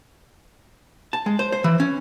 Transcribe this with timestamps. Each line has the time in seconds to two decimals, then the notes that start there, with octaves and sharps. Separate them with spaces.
1.13 A5
1.26 G#3
1.39 C5
1.52 C5
1.64 E3
1.80 C#4